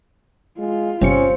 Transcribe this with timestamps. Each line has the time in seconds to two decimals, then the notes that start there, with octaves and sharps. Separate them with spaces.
0.59 G#3 F4
1.01 G1 C3 C4 C#4 C#7